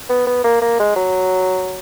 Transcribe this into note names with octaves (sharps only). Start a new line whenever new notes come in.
B3
B3
A#3
A#3
G#3
F#3